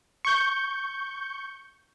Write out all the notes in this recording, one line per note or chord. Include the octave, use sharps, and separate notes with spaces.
C#6 G6